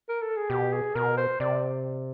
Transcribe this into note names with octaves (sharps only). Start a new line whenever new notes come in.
A#4
A4
G#4
B2 G4
G#4
B2 A#4
C5
C3 D5